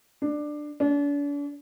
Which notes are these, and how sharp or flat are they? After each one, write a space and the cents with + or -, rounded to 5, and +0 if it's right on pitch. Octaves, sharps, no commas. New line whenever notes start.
D4 +15
D4 -40